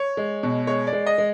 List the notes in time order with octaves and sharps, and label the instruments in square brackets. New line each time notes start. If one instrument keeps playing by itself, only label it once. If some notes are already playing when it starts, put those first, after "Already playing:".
Already playing: [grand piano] C#5
G#3
B2
G#3 C#5
D5
G#3
D#5
G#3